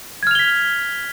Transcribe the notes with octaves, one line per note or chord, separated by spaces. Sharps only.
F6 G#6 B6 F7 G7